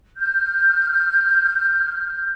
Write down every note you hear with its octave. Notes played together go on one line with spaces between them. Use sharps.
F6 G6